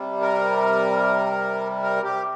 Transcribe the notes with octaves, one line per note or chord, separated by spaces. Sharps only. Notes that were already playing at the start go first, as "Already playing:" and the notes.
Already playing: C3 G3
A#4
A#4
G4